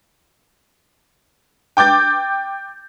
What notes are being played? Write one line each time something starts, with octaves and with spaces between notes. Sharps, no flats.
G5 D6 G6 A6